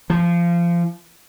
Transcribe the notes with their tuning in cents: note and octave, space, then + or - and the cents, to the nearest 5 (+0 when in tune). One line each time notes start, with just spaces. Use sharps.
F3 -25